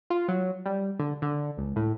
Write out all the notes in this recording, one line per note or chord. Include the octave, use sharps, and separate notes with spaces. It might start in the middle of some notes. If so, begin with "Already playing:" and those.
F4
F#3
G3
D3
D3
C#2
A2